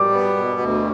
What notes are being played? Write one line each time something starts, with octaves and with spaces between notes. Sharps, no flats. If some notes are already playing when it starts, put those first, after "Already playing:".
Already playing: G3 D6
B3
B2
D2